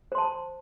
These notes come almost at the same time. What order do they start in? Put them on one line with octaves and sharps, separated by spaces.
C5 C6 A5